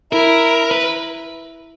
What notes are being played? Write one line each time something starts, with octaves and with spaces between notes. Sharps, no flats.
E4 A#4
B4